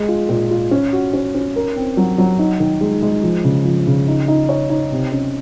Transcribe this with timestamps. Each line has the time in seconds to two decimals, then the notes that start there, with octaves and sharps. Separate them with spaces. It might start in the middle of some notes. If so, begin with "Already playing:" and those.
Already playing: G#3 G#4
0.08 F4
0.29 A#2
0.51 F4
0.71 C#4
0.93 F#4
1.13 C#4
1.35 C#4
1.56 A#4
1.76 C4
1.97 F#3
2.18 F#3
2.39 D#4
2.60 D#3
2.81 G#3
3.02 G#3
3.23 F3
3.44 C#3
3.65 F3
3.87 C#3
4.08 D#4
4.28 D#4
4.49 C#5
4.70 D#4
4.91 C3
5.12 C#4